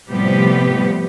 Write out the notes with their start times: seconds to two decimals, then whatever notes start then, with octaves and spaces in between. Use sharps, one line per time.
0.11 A2 C3 F3 G3 B3 G4